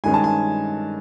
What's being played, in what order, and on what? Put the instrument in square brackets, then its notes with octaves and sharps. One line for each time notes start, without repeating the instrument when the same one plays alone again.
[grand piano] G2 D#3 G#3 C#4 G#5
A5
G#5